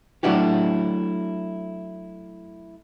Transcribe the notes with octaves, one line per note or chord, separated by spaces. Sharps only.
F#3 A3 D4 E4 F#4 G4